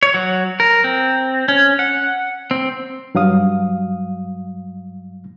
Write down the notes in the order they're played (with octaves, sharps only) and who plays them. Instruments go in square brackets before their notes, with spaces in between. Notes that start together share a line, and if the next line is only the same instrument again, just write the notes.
[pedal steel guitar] C#5
F#3
A#4
C4
C#4
F#5
C4
[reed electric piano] G2 F#3 F5 D#6